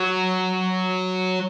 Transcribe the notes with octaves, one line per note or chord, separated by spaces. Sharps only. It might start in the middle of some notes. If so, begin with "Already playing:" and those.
Already playing: F#3